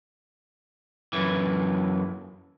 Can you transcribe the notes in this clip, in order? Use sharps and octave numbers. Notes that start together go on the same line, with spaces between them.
F#2 E3